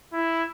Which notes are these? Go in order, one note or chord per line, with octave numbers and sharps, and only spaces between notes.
E4